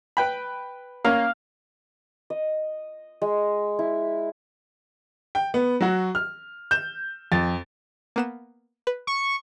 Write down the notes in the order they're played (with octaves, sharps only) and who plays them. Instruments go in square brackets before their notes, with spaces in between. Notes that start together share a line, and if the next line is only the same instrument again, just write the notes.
[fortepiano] B4 G5 B5
[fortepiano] A#3 C#4 [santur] F5
[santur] D#5
G#3
E4
[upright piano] G5
B3
F#3 F#4
F6
G6 E7
F2 A6
[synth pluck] A#3 B3 E7
B4
[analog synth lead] C#6